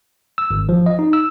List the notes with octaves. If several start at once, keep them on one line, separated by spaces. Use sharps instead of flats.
E6
G#1
F3
D#5
D#4
E6